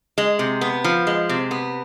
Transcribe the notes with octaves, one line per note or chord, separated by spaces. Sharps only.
G#3
C3
B3
F3
G#3
C3
B3